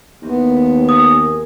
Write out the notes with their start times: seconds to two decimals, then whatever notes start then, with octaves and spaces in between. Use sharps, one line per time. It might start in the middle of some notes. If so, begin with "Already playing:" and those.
0.22 D#2 D#3 E3 B3 C4
0.89 G#4 A#4 G#5 D#6